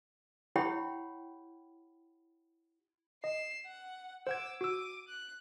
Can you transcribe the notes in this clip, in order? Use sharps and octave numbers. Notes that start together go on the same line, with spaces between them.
E4 G4 C#5 F#5 G5 B5
D#5 C7 E7
F#5
C5 F#5 D6 E6 G#6
F#4 D6 E6 D#7
F#6